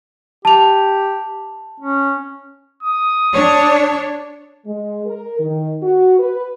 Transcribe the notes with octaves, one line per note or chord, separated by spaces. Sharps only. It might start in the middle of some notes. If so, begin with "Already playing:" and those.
G4 A5 F7
C#4
D#6
D4 C#5
G#3
A#4
D#3
F#4
B4